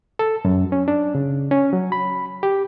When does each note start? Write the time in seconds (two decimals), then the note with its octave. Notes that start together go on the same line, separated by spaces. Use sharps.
0.19 A4
0.45 F#2
0.72 C#4
0.88 D4
1.15 C#3
1.51 C#4
1.73 F#3
1.92 B5
2.43 G4